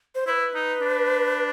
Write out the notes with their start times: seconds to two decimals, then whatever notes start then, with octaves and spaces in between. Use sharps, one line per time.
0.15 C5
0.27 E4 C5
0.30 B4
0.55 D#4
0.81 D4